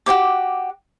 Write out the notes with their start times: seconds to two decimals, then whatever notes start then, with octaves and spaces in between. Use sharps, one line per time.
0.06 F#4 G4 C5 D6